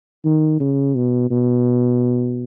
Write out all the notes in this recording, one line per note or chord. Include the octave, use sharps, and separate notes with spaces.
D#3
C#3
B2
B2